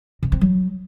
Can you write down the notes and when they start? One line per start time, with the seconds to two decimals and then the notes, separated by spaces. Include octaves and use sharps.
0.23 C3
0.32 C4
0.41 F#3